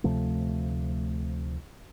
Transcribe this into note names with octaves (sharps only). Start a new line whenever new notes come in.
D2 C3 F3 A3